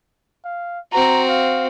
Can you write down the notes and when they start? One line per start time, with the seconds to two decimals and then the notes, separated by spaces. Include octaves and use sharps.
0.45 F5
0.93 C4 F#4 A#5
1.29 F5